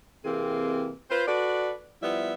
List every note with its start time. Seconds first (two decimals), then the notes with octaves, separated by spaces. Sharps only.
0.25 C3 E3 A#3 C4 G#4
1.10 F4 B4 C5
1.27 F#4 A4 B4 D5
2.02 F3 G3 B3 E4 E5